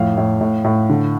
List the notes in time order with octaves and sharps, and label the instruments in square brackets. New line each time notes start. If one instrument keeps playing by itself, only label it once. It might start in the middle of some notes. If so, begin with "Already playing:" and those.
Already playing: [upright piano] F2 A2 F5
A2
A2
A2
D3